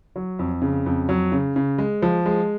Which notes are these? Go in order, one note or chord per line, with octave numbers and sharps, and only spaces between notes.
F#3
F2
C#3
F2
F#3
C#3
C#3
G#3
F3
G#3